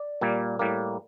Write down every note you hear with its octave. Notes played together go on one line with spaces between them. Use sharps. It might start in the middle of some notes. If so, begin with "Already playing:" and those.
Already playing: D5
A#2 G3 A#3
A2 G3 A#3